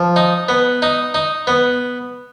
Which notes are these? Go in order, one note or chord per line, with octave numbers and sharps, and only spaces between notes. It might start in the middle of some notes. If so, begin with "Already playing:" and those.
Already playing: F3
D#4
B3
D#4
D#4
B3